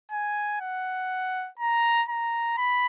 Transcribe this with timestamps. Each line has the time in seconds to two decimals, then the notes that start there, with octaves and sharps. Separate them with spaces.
0.12 G#5
0.61 F#5
1.59 A#5
2.09 A#5
2.58 B5